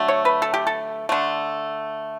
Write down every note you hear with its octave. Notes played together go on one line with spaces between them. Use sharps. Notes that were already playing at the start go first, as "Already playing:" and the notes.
Already playing: D3 F#3 A3
C#5
B4
A4
G4
A4
D3 A3